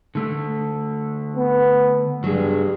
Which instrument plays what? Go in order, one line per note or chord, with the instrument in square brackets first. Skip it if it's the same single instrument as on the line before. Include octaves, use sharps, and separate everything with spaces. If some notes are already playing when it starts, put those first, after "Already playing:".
[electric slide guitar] D3 A3
[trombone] B3
[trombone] G2 [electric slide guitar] F#3 G#4